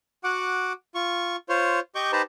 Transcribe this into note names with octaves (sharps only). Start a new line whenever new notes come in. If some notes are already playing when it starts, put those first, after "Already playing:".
F#4 F#5 D6
F4 C#6
F4 C5 C#5
G4 D#5 C#6 D6 G6
D#4 G4 B4 C5 A5 A#5